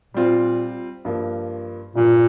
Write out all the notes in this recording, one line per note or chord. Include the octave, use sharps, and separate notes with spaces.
A#2 G3 C4 F4
G2 F3 A#3
G2 A#2 F3 A#3